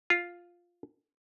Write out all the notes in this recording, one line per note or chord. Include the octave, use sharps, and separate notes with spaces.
F4